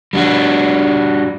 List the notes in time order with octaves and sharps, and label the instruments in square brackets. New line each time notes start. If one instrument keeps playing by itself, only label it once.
[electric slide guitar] G3 D4 F#4